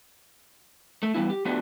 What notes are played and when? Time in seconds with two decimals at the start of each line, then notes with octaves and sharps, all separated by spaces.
1.03 A3
1.14 E3 G3 B3 E4
1.30 G4
1.45 F3 A3 B3 D4 F#4 G4